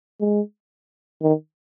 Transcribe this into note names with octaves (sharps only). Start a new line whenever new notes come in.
G#3
D#3